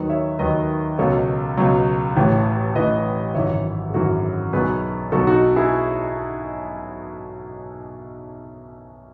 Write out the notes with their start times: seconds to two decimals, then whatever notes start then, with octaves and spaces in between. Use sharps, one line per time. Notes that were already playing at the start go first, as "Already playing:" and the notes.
Already playing: D#2 D#3 F#3 B4 D#5
0.09 C#5 E5
0.39 D#2 D#3 F#3 B4 D#5
0.98 C#2 B2 F#3 A4 C#5
1.57 C#2 B2 F#3
2.16 A1 A2 E3
2.75 A1 A2 E3 B4 D#5
3.34 G#1 F#2 E3 C#5 E5
3.90 G#4
3.94 G#1 F#2 E3 F#4 A4
4.53 B1 B2 F#3 G#4 B4
5.12 B1 B2 F#3 F#4 A4
5.27 D#4 F#4
5.56 E4 G#4